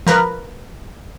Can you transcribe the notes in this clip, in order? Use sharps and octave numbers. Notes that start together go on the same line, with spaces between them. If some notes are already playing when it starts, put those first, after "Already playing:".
F3 A#4 B4